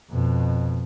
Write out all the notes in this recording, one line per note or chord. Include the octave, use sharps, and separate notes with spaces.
F2 B2